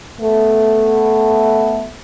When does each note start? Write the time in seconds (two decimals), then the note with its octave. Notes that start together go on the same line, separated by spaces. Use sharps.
0.21 A3 B3